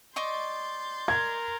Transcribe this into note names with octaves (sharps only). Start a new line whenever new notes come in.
D5 D#5 C6 C#6 G6 A6
A#4 G#6